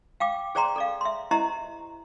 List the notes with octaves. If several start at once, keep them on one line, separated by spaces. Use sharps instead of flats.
F5 G5 D6
G#4 C5 D5 G5 A#5 C6
A4 D5 F5
E5 C6
E4 G4 C5 D#5 E5 A#5